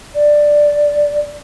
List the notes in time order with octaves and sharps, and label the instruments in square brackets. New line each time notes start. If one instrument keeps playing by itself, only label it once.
[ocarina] D5